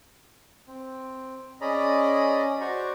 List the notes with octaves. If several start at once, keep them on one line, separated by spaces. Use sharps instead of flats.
C4
C#4 G#4 D5 D#5 A#5 B5
F#4 C5 D5 A#5 C#6